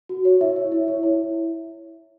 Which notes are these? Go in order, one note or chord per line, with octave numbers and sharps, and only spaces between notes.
F#4
C#5
E4 E5
C#5
E4
C#5
E4